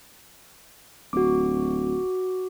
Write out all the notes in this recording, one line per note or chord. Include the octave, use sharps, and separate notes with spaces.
D1 F#4 D6